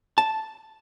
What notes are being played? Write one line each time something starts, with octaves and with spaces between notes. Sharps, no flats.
A5